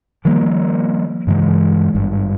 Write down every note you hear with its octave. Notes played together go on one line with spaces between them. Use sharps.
D#3 F3 G3 A#3
G2 C#3 E3 G#3
G#1 G2